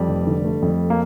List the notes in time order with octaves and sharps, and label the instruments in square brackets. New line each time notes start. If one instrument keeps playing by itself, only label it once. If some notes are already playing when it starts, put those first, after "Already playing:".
Already playing: [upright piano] F2 [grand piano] G3
[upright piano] F1
D3
A3
F2
[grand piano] A#3